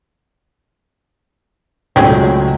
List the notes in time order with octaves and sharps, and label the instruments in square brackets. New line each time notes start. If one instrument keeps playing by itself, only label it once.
[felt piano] C#2 A2 F#3 [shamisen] C4 C#4 G#4